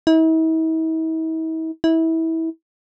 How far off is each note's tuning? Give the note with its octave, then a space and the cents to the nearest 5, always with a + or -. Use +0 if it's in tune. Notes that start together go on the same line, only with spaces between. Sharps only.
E4 -45
E4 -25